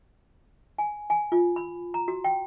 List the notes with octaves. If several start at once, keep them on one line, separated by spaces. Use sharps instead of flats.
G#5
G#5
F4
B5
A#5
F#4
G5